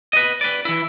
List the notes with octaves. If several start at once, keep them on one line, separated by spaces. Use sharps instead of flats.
B4 D#5
B4 D5
E3 E4